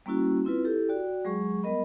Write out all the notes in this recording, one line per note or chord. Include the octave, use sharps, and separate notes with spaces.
G3 A#3 C#4 E4 F#4
C4 E4 F4 B4
E4 G4 A4
F#4 D5 G5
F#3 G#3 G#4 C#6
G3 B3 A#4 D#5 B5